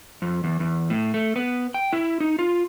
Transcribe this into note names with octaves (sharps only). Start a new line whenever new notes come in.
F2
E2
E2
A2
A3
B3
G5
E4
D#4
F4